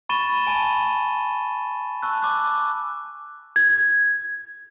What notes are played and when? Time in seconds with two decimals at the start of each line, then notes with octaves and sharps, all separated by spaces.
0.09 B5 C#6 A6 D#7 E7 G7
0.47 G#5 A5 B5 D#7
2.03 A5 C#6 E6 F#6
2.22 D6 F#6
3.56 G#6